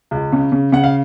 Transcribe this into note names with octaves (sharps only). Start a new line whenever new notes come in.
C#2
C#3
C#3
C#3 F#5
F5